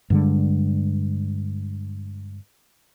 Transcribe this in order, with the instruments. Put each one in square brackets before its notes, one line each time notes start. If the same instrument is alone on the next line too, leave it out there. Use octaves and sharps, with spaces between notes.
[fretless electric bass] G2 D3 G#3